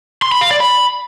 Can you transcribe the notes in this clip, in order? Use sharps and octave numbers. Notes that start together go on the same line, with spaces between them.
C6
B5
F5
D5
B5